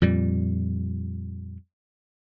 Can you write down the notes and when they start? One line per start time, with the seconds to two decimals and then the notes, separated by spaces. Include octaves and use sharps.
0.02 F2 A#2 G3